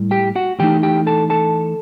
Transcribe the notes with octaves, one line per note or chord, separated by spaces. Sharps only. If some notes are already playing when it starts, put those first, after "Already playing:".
Already playing: A2 G3
G4 G5
F#4 F#5
A2 E3 A3 D#4 G4 G5
G4 G5
A4 A5
A4 A5